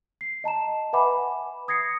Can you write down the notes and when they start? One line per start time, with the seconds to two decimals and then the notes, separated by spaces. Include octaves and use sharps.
0.21 C7
0.44 D#5 A5 A#5 E7
0.93 B4 E5 F#5 G#5 B5 D6
1.68 D#6 G#6 A#6 C7 C#7